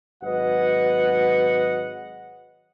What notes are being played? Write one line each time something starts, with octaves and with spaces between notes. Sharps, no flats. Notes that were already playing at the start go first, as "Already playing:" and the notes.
G#1 F#3 B4 D#5 F#5